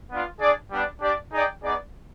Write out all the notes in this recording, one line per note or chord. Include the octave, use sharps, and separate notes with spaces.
B3 D4 F4
D4 G#4 D5
G3 B3 D4
D4 G4 D5
D#4 G#4 D5 G5
B3 D#4 G#4 D5